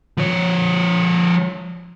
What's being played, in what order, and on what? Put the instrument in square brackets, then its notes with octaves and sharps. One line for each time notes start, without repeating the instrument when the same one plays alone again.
[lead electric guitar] F3 C#5